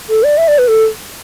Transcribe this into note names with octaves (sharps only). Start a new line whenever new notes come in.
A4
D5
E5
D5
B4
A4